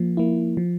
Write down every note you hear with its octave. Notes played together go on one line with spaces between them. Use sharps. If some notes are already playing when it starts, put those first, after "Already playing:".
Already playing: F3 A#3
A#3 E4
F3